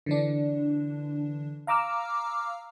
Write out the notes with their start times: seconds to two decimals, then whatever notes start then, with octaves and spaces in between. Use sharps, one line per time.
0.06 D3 E3 D4
1.67 F5 A#5 D6 E6 F6